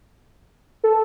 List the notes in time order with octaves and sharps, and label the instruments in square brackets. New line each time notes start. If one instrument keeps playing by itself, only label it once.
[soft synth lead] A4